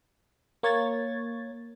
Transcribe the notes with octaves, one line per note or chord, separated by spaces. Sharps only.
A#3 C#5 G#6 A6